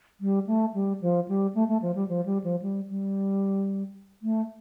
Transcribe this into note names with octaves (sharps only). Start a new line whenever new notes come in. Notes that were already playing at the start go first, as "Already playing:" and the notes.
G3
A3
G3
F3
G3
A3
A3
F3
G3
F3
G3
F3
G3
G3
A3